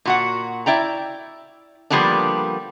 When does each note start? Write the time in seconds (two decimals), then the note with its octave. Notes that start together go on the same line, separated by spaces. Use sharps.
0.05 A#2 F#4 F#5
0.66 E4 D5 G5 A#5
1.90 D3 F3 G3 A#3 B3 D4